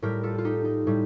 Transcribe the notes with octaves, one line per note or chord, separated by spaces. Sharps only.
A2 G3 G4 A#4
F4 A4
F4
D#4 G4
D#4
A2 G3